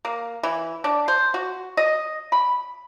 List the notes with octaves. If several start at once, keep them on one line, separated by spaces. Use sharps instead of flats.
A#3
E3
D4
C5
F#4
D#5
B5